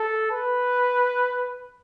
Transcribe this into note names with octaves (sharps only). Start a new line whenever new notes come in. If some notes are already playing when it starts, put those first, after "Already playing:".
Already playing: A4
B4